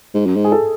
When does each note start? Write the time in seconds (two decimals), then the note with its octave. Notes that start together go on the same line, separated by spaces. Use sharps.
0.14 G#2
0.26 F#2
0.37 G#2
0.45 G#4
0.52 A4